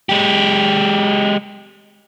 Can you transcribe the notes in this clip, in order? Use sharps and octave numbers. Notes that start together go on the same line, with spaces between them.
G#3 G4